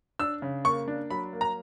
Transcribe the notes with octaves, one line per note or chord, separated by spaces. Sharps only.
D4 E6
C#3
A#3 C#6
D4
F#3 B5
A#3
A#5